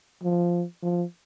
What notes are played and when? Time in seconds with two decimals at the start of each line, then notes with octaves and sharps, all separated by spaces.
0.23 F3
0.83 F3